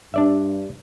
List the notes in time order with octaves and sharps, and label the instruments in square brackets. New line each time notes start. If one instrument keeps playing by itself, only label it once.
[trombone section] G2 [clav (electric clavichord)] D4 D5 E5